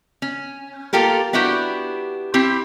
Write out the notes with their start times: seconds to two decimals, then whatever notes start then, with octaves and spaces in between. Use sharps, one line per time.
0.22 C#4
0.93 A#3 F4 G4 A4 A#4
1.33 B3 D4 E4 F#4 G4
2.34 C4 E4 G4